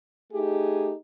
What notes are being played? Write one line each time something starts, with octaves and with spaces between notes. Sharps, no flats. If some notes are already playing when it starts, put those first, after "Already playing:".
A3 D#4 G4 G#4